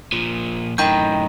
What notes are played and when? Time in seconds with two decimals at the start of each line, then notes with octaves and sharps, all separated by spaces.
0.13 A#2 F3
0.78 F#2 A2 D#3 G5 B5 G6